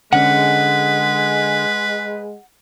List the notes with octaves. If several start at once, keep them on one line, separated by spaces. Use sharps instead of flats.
D3 G#3 C#4 B4 F#5